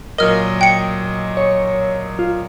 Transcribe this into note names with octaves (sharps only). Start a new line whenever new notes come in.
A#2 F#3 A#4 D#5 F6
G5 C#7
C#5
F4